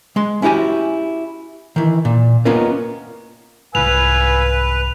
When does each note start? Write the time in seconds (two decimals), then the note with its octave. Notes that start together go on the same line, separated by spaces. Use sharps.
0.16 G#3 C6
0.42 C#4 E4 F#4 G4 G#5
1.76 D#3 E3
2.05 A#2
2.45 A#3 B3 C#4 D#4 F4 A#4
3.75 C2 G#2 B4 F5 G#5 E6 F7